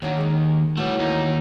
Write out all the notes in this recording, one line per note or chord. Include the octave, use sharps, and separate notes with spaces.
D#2 D#3 F#3 D4 F#4
G#3 D#4
E3 F#3 G3 A3 F#4
D#2 D#4